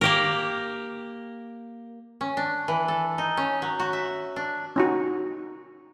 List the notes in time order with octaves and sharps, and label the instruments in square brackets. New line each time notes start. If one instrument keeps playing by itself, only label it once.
[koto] A#3 G4 A#4
C#4
D4
E3
A4
D#4
C#4
F#3
F#4
E5
D4
[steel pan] C#4 D#4 F#4